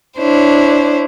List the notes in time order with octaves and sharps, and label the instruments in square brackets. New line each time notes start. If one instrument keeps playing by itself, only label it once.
[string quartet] D4 E4 C5 C#5